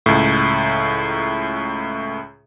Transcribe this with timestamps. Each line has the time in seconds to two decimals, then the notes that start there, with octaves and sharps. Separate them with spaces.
0.06 C#2 A2